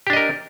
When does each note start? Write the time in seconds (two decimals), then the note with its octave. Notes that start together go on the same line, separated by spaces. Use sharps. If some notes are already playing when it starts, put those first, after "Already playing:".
0.07 G4
0.10 D4
0.13 D#5
0.17 A#4